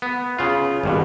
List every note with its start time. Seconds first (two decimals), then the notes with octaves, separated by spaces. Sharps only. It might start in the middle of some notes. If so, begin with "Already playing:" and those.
0.02 B3
0.39 C#3 F4
0.83 G#1 G2 B2